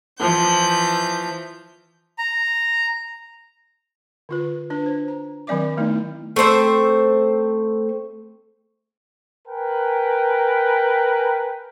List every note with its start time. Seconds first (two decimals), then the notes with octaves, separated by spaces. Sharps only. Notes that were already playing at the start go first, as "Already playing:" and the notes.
0.19 E3 F3 G6
2.18 A#5
4.29 D3 F4 B4
4.70 D4 B4
4.86 C5
5.08 A#5
5.47 D#3 F#3 C4 D5 E5 D6
5.77 D#3 A3 B3 D#4 E4
6.36 A3 C4 C5 E5
9.48 A#4 B4 G5 G#5